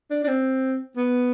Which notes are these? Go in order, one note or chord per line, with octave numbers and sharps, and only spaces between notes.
D4
D4
C4
B3